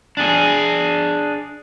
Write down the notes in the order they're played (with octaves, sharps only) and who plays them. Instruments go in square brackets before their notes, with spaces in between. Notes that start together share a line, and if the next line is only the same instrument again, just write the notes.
[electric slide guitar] D4 G#4